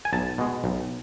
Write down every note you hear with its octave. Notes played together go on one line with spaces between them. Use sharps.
G#5
B1 A5
B2 G#3
B1